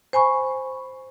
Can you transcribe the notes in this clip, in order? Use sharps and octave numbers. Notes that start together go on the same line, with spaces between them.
C5 G#5 B5 C#6